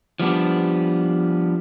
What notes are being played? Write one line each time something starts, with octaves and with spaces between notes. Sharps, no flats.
F3 G3 B3 D4